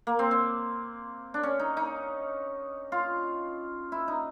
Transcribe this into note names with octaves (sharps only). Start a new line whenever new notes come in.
A#3
C4
C4
D4
C#4
D#4
D#4
F4
E4
D#4